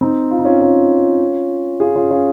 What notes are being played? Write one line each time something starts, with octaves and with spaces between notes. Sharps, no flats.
C4 D#4
F4
D#4
C#4 F4
C#4 F4
F4 G#4
C#4 F4
C#4 F4